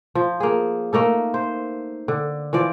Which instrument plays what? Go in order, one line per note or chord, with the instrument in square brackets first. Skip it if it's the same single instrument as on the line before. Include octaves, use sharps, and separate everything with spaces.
[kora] F3
A#3 G#4
A3 A#3 D#4 A4
C5
D3
E3 F3 D5